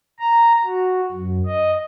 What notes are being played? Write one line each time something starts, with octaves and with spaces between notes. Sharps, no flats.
A#5
F#4
F#2
D#5